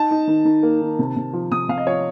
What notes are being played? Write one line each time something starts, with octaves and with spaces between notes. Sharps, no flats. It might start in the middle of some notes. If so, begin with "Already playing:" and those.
Already playing: D#4 A5
D#4
D#3
D#3
A#3
D#3
C3
C3
F3
C3 D#6
C3 F5
D#5
F3 C#5